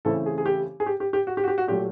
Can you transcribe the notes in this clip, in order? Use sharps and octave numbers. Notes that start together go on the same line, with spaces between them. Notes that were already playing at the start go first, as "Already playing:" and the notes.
C#3 E3 A3 C4 E4 A4
G#4
G#4
G4
G#4
G4
G4
G4
F#4
G4
F#4
G4
F#4
A#2 F#3 A3 G4